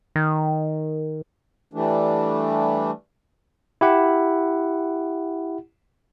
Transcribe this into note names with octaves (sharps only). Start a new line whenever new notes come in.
D#3
E3 G3 A3 D4
E4 G4 F#5